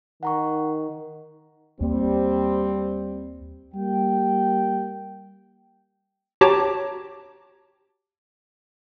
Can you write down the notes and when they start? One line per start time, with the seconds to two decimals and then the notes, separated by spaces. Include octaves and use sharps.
0.23 D#3 F#5 A#5 C#6
1.81 D#2 G3 A#3 C4
3.74 G3 A#3 G5
6.41 F#4 G4 C#5 A5 A#5 D6